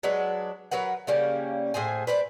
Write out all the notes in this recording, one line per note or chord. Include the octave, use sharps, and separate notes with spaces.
F#3 G#3 D4 B4
F#3 A#4 B4 F#5
C#3 G3 A#3 C#4
A2 G#4 C5 G#5
B4 C5 D5